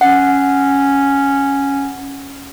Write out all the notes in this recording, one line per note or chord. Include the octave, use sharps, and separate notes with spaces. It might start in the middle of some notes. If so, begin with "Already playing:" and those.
C#4 F#5